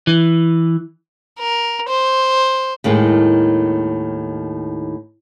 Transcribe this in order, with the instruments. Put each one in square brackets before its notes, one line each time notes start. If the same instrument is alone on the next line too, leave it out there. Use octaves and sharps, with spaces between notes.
[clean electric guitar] E3
[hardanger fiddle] A#4
C5
[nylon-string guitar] D#2 A2 D#3 G#3